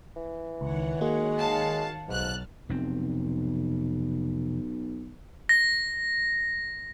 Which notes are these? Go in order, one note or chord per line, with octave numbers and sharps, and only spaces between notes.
E3
C#2 D#3 C#5 F#5
G#3 A#3 F#4
F5 A5
B1 G#2 A5 F6 F#6
F1 B1 C4
A#6